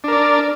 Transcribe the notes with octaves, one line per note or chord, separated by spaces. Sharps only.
D4 A#4 D5